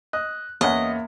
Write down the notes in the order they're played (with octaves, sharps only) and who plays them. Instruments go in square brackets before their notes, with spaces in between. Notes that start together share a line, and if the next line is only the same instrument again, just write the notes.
[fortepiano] D#5 [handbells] F#6
[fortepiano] E2 C#4 F#5 [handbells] A#3 E5 [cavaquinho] D#5